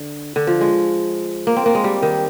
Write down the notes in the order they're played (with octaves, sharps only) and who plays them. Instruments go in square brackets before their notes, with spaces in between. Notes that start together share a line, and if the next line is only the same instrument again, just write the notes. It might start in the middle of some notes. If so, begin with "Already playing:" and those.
Already playing: [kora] D3
D3
F3
G#3
A#3
C4
A#3
G#3
G3
D#3